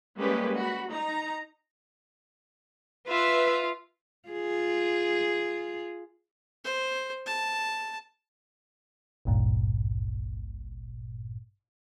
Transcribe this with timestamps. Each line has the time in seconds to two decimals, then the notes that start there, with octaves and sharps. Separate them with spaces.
0.18 G3 G#3 A#3 C#4 G4 B4
0.56 F#4 B5
0.89 D#4 A#5
3.08 F4 B4 E5
4.29 F4 G#4
6.65 C5
7.26 A5
9.25 G#1 C#2 G2 A#2